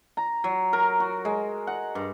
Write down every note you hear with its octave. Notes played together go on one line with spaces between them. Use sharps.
A#5
F#3
A#4
F#4
G#3
F#5
G2